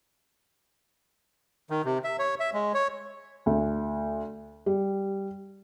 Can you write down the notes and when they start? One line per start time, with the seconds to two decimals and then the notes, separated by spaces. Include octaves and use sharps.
1.70 D#3
1.85 C3
2.04 E5
2.19 C#5
2.40 E5
2.54 G#3
2.74 C#5
3.46 D2
4.66 G3